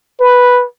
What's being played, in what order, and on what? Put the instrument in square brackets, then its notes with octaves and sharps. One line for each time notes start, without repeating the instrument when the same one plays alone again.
[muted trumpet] B4